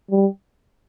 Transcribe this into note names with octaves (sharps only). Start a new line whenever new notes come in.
G3